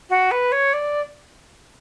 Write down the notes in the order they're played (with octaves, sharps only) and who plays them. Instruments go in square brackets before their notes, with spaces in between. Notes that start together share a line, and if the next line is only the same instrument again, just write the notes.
[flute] F#4
B4
C#5
D5